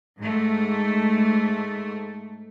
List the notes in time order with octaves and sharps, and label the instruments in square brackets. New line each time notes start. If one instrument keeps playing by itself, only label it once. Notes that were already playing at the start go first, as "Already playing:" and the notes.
[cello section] G#2 A3